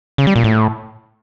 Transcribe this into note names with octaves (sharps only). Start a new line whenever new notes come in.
C#3
G3
A#2
A2